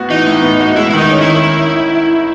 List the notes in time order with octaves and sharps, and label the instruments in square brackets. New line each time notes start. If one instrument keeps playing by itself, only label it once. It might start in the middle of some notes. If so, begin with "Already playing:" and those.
Already playing: [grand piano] A2 B3 F#4
[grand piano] E3 [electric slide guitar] D#4
[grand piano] A2
B3
F#4
[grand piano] G#3 [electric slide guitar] E4
[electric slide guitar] E4
[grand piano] D#3 [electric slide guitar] D#4
[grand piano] C#4
[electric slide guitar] E4
[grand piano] D#3